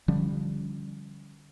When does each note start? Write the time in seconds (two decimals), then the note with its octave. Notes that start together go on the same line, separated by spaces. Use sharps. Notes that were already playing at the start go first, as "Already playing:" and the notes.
0.08 D3 F3 G3 C#4